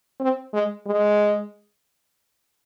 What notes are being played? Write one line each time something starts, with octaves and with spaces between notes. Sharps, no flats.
C4
G#3
G#3